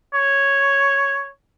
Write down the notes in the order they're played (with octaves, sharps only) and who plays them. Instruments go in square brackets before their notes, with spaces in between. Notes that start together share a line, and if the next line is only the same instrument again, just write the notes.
[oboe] C#5